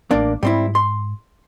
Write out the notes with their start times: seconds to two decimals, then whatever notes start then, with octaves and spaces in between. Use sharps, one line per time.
0.11 A1 A3 A#3 D4
0.43 G#2 G3 C4 E4
0.75 C6